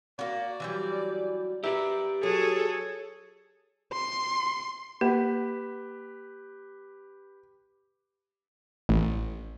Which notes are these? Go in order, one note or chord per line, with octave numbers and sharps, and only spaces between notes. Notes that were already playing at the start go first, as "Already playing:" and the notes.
A#3 F#4 D5
E3 F#3 G3
G4 A#4 B4 D5 E5
F#3 G#4 A4 C#5
C6
A#3 G4 B4
A1